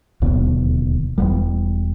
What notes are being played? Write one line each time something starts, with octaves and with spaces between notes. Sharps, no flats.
D1 D#2 B2
E1 G3